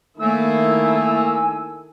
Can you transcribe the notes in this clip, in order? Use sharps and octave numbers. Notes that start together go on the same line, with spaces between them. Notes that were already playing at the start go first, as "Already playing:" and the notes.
D#3 A3 A#3 E4 A4 G#5 E6